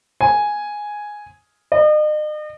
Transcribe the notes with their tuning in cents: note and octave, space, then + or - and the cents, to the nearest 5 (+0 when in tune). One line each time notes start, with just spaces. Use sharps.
G#5 +0
D#5 -40